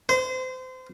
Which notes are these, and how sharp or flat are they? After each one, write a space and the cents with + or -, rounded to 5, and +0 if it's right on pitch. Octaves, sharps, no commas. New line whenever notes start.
C5 -30